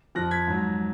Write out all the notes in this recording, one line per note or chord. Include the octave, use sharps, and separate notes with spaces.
F2 F3 F#6 A#6
G#6 B6
G#2 F#3